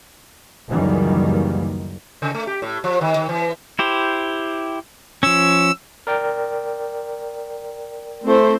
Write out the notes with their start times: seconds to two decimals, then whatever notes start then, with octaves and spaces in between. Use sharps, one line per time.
0.69 C#2 F#2 D#3 E3 G3 A#3
2.22 C#3
2.34 A3
2.47 G4
2.62 A2
2.84 F3
3.01 D#3
3.16 D#3
3.29 E3
3.79 E4 G4 C5
5.23 F3 C#4 E6
6.07 A#4 D5 G5
8.24 A3 C4 E4 C5